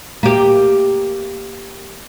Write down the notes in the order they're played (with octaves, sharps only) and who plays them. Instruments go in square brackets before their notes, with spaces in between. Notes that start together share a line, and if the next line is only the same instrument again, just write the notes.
[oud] A#3 G4